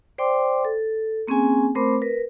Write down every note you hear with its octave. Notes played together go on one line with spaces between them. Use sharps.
C5 D5 G5 C6 D6
A4
A#3 C4 C#4 G#4 G#5
A3 C4 A#4 C5 B5 D6
A#4 B4